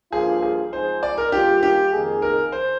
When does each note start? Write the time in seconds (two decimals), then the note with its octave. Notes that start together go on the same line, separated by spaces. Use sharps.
0.12 G2 F3 A#3 F4 G#4
0.42 G#4
0.72 G#2 F3 C4 D#4 G#4 C5
1.03 D5
1.18 A#4
1.32 D#3 G3 A#3 F4 G4 G#4
1.63 G4
1.92 F2 D#3 A#3 D#4 G#4
2.22 A#4
2.52 C5